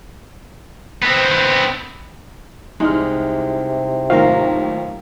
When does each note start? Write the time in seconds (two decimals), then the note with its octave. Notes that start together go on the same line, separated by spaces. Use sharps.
1.02 B3 C4
2.80 C2 C3 E3 G#3 D#4 F6
4.10 D#2 A2 F#3 F4 A#4 C5 F5